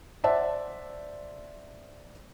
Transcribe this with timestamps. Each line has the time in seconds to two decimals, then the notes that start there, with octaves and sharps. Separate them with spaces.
0.24 C5 D5 E5 F#5 A5